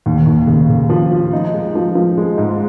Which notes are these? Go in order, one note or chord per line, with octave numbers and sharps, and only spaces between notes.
D#2
D#2
C#3
C#3
F3
F3
D#4
G#3
F3
F3
G#3
G#2